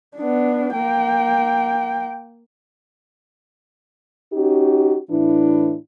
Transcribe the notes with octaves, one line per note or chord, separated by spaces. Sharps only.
B3 D4
A#3 G5
C#4 D#4 F#4 G4
A2 E3 D4 E4